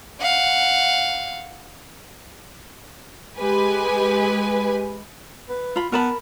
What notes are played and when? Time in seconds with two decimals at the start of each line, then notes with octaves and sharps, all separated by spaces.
0.21 F5 F#5
3.38 G#3 G4 B4 G#5
5.49 B4
5.76 F4 B5
5.92 B3 A#4 A5 B5